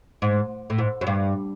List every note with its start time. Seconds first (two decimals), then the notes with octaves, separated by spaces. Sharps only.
0.22 G#2
0.70 A2
0.78 G#2
1.01 F#2
1.07 G2